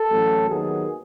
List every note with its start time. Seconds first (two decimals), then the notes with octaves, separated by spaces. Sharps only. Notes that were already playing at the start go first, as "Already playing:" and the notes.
Already playing: A4
0.10 A1 A2 F#3
0.49 D#2 D#3 F#3 B3 G#4